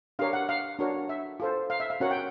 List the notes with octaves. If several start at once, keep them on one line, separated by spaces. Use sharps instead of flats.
D4 G4 A#4 C#5 F5
F#5
F5
D4 F#4 A#4 C#5
E5
F4 A4 C5
F5
E5
F5
C#4 F#4 A#4 C#5 F#5
G5